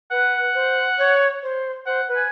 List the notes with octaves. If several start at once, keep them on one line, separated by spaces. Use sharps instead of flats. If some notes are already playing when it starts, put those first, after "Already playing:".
B4 F#5
C5
C#5
C5
C5 F#5
B4
G#5